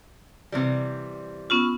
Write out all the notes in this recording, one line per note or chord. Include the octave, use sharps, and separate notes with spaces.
C3 E3 G3
B3 C#4 F4